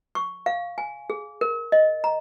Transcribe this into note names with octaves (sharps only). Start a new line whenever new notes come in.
C#6
F5
G#5
G#4
A#4
D#5
A#5